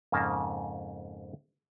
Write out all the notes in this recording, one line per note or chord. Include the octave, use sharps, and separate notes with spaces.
F2 G#2 C#3 A#3 A5 A#5